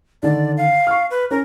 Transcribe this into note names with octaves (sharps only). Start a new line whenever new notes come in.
D3 D#3 D5
F5
C#6 F6
B4
C#4 A#4